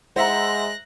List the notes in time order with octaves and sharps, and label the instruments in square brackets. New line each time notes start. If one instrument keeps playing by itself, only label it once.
[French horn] G#3 [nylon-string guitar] E4 F#5 [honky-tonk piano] C5 E5 A#5 [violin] F#6 A#6